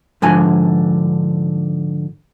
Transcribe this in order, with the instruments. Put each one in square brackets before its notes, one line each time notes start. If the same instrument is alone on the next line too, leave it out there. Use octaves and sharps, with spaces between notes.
[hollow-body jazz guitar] G#2 D3 F3 G#5